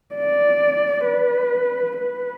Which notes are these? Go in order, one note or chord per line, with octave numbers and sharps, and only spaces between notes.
D5
B4
B4